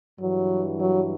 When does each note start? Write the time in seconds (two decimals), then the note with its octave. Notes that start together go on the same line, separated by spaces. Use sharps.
0.18 G2 E3 F#3
0.79 F#3